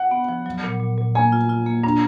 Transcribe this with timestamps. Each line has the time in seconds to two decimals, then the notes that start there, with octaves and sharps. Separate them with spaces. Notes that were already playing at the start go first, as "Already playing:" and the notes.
Already playing: F#5
0.11 B3
0.29 F3
0.46 F#3
0.64 A#2
0.80 A#2
0.98 A#2
1.15 A#3 G#5
1.32 F4
1.49 F4
1.67 A#3
1.83 D4 A#5